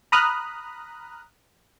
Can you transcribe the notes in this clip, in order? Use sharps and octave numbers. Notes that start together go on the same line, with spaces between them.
A#5 B5 D#6 F6 F#6